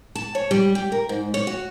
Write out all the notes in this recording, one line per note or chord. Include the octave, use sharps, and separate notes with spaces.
A5
C#5
G3
G4
A#4
G#2
C#5
F#4